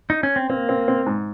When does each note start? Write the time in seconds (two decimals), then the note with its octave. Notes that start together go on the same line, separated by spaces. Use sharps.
0.10 D#4
0.23 C#4
0.36 C4
0.50 A#3 C4
0.69 C4
0.88 C4
1.06 G#2